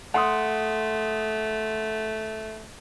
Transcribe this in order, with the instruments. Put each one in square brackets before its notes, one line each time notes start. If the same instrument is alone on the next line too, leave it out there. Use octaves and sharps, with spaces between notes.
[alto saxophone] A3 [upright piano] F#5 C6 D#6